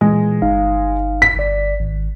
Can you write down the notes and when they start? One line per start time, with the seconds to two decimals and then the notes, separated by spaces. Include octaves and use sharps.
0.01 A#2 E3 G#3
0.42 G1 D#4 F5
1.22 B6
1.36 G1 D5
1.80 G#1